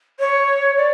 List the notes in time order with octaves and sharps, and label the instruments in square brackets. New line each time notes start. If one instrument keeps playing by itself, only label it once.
[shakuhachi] C#5
D5